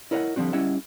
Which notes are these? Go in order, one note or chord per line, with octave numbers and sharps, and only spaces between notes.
E4 A#4 C#5 D#5 F5 F#5
D3 F3 G3 C4 F#4
G3 C#4 E4 D#5 E5 F#5